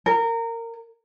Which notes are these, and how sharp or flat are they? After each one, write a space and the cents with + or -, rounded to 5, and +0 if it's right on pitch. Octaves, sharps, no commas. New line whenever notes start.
A#4 -20